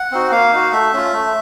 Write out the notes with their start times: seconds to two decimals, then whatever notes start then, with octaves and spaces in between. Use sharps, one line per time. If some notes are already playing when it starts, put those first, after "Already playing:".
Already playing: F#5
0.11 C4 D#4 F#4
0.31 A#3 F5
0.53 D#4 F#4
0.72 A3 E5
0.93 C#4 F4
1.13 A3